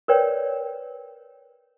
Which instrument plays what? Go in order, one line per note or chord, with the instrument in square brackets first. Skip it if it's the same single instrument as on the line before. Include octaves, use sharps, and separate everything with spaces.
[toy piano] A#4 B4 C#5 D5 G5